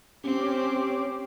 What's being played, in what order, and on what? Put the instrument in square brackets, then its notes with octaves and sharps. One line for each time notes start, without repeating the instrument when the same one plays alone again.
[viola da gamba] C4 [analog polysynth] C#4 G4 D6